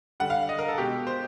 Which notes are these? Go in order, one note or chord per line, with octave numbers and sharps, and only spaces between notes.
D3 G3 F#5
F5
D#5
A#4
A4
B2 G#3 G4
C5